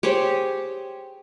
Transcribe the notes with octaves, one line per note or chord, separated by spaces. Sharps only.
G4 G#4 C5 C#5